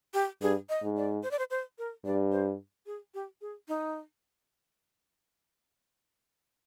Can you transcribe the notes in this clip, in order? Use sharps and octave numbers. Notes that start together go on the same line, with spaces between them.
G4
G2 G#4
D#5
G#2
D5
C5
D5
C5
C5
A#4
G2 D5
C5
G#4
G4
G#4
D#4